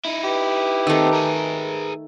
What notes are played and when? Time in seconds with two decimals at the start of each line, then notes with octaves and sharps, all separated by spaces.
0.05 D#4 E4
0.24 G4 B4
0.87 D#3 A3 B3 C4
1.13 G#4 A#4